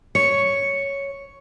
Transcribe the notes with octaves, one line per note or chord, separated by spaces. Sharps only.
C#5 C#7